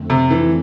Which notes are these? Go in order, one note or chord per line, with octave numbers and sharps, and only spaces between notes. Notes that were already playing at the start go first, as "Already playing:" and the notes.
Already playing: F2 D3 A3 C4
C3
E3